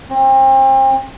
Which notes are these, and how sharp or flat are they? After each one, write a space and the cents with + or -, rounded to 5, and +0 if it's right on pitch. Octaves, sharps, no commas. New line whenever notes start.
C4 +35